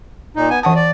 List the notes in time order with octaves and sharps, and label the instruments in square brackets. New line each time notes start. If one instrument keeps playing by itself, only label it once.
[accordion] A#2 D#4
B3 G#5
[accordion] F#2 D#6 [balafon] E3 F#5 A5
[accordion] D5